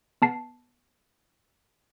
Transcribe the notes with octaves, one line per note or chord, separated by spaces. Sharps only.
B3 A5 C7